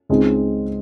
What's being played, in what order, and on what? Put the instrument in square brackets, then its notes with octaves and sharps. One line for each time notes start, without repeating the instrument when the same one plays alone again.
[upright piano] C#2 C#3 G#3 C4 D#4